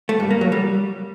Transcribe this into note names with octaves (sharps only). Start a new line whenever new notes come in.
A3
G2
A#3
F#3
G3